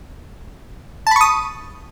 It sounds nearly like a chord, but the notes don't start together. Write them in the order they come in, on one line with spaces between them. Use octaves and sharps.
A5 B5 C#6 D#6